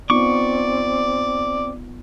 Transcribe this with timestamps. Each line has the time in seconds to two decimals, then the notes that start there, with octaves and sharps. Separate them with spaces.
0.10 B3 C4 D#4 F4 D5 C#6 D6